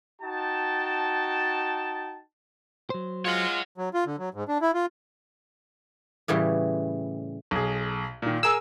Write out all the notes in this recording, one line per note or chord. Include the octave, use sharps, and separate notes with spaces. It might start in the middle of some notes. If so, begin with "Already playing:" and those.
D#4 F#4 G5 A5
F#3 C5
G#3 F4 C#5 F#5
F#3
F4
D3
F#3
G#2
D4
E4
F4
A2 C#3 E3 G3
B1 G#4
A#2 D#3
G#4 A#4 G#5 E6